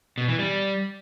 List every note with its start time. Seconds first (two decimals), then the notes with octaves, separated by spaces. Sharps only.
0.18 B2
0.28 E3
0.39 G3